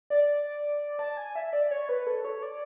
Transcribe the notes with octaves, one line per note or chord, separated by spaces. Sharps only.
D5
A5
G#5
E5
D5
C#5
B4
A4
C#5
D5